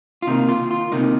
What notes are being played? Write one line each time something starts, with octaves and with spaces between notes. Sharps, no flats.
F4
C3 D#3 A#3 D#4
F4
F4
C3 D#3 A#3 D#4